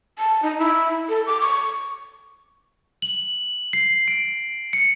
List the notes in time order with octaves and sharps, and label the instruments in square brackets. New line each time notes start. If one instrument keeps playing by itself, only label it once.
[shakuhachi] A5
D#4
E4
A4
D6
C#6
[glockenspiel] F#7
C7
D7
C#7